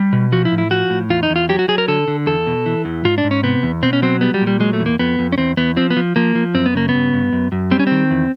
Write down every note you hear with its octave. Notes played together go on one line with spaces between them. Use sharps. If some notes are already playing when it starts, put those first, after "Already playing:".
Already playing: G3
B2
F3 F#4
E4
A2
E4
F3 F#4
A2
E2 F4
D#4
E2
F4
F#3 G4
F#4
F#3 G#4
A#4
D3 A4
D3
E2 A4
B2
E3
E2
G#2 F4
D4
G#2
C#4
C3 B3
E2
B2 C4
C#4
F#3 C4
G3 B3
G3
A#2
G3
F#3 G#3
A3
E2
A#3
F2 B3
F2
C#4
E2 C4
E2 B3
F3 C4
B3
F3
F3 A#3
F3
F#2 C4
B3
C#3 A#3
B3
G2
G2
F#2
F#2
G3 C4
C#4
D#3 C4
E2